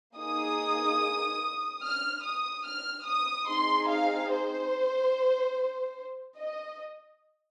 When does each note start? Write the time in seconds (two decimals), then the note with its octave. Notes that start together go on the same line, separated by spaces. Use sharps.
0.17 A#3 D#4 G#4 D#6
1.83 F6
2.23 D#6
2.66 F6
3.06 D#6
3.48 C4 D#4 G#4 C6
3.90 F5
4.31 C5
6.37 D#5